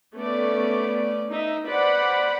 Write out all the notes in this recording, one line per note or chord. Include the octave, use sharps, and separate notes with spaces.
A3 B3 C#4 D5
D#4 E5
B4 C5 D5 F#5 B5